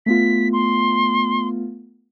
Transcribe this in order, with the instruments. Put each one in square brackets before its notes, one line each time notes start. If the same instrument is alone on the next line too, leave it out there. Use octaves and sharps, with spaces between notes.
[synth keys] A3 B3 F4 [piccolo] B6
[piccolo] C6